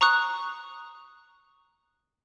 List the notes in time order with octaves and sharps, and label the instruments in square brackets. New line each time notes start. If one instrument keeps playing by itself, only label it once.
[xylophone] A#5 C#6 D#6 F#6